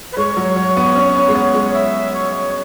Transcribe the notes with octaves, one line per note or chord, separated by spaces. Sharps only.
B4
G#3 C#5
F#3
F#3
B3
C#4
B3
G#3
B3
G#3
E5
C#5